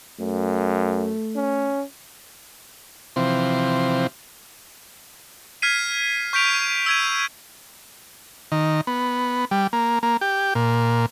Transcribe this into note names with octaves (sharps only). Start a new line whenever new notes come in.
F#2 A3
C#4
C3 E3 F3 C4
F6 G#6 B6 C7 D#7
C#6 G6 B6 D7 F7
E6 G#6 D#7
D#3
B3
G3
A#3
A#3
G4
A#2